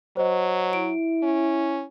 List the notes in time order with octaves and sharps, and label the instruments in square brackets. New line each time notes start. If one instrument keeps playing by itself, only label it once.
[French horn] F#3 [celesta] C5 D#5
[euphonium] E4 [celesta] D7
[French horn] C#4